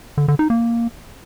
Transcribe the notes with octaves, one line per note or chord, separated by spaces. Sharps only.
D3
D3
D#4
A#3